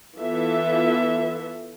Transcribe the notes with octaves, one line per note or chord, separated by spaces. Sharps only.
E3 B3 F4 A4 E5